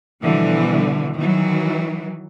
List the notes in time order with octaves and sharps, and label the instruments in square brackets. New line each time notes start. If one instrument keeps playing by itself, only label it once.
[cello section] B2 D3 E3 F3 G3
D#3 E3 F#3